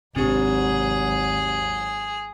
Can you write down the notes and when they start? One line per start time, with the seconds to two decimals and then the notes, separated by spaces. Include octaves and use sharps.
0.16 G#1 D#2 C3 F#3 C4 D4 G4 G#4